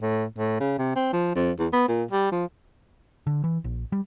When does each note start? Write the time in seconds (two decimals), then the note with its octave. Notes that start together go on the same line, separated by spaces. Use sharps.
0.02 A2
0.38 A2
0.60 C#3
0.78 C3
0.96 C4
1.13 F3
1.35 F2
1.59 E2
1.73 B3
1.88 A#2
2.11 G3
2.32 F3
3.27 D3
3.44 E3
3.64 A#1
3.92 G3